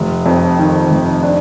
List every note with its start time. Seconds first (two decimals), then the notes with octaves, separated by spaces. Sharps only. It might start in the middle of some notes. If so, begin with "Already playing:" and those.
Already playing: F1
0.26 F2
0.58 D#3
0.90 F1
1.23 D4